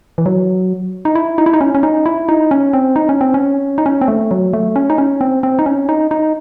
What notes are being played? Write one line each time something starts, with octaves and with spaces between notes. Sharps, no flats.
E3
F#3
D#4
E4
D#4
E4
D#4
C#4
C#4
D#4
E4
D#4
C#4
C4
D#4
C#4
C4
C#4
D#4
C#4
C4
A3
F#3
A3
C#4
D#4
C#4
C4
C4
D#4
C#4
D#4
D#4